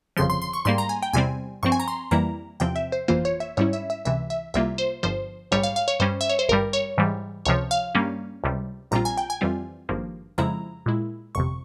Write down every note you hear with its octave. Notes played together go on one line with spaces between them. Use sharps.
G1 F2 C#3 F3 C6
C6
C6
C#6
G#2 G3 A#3 C6
A#5
G#5
G5
E2 C3 G3 C4 G#5
G2 F3 C4 C#6
G#5
A#5
C6
F2 E3 G3 A#3 E4 A#5
E2 C3 F3 C4 G5
E5
C5
G1 F2 E3 A#3 F4 C5
C#5
E5
G#2 G3 C#4 E4 C#5
E5
E5
C#2 C3 E3 E5
E5
C2 C3 G3 A#3 F4 E5
C5
G1 G2 F3 C5
A#1 G#2 G3 C#5
F5
F5
C#5
G2 G3 C#4 C5
E5
C#5
C5
G#1 G2 G3 A#4
C#5
G#2 E3 G3
C#2 C3 F3 C#5
F5
G2 G3 A#3 C#4
C#2 C3 G3
A#1 A#2 G3 C4 F4 A#5
G#5
G5
G#5
F2 E3 G3 C4 F4
G#1 G2 F3 A#3
F2 C#3 F3 G#3 E4 A#5
A#2 G#3 E4
G1 F2 C3 C#6